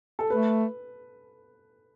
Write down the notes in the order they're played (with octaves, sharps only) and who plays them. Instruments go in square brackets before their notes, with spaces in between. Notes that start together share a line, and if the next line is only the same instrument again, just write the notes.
[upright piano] A4
[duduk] A3 [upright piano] B4